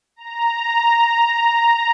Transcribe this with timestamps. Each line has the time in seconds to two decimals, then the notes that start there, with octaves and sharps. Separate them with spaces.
0.16 A#5